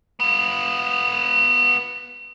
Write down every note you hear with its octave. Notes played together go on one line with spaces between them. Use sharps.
B3 F4